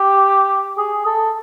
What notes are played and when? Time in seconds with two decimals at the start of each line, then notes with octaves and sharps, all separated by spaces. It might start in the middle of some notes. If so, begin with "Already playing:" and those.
Already playing: G4
0.77 G#4
1.06 A4